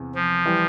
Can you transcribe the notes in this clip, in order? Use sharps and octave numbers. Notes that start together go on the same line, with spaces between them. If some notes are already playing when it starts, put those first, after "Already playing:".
Already playing: E2 C3
F3
E3 G3